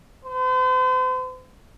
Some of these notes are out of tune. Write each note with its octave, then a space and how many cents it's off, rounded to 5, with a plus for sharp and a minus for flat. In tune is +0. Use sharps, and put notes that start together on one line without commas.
C5 -45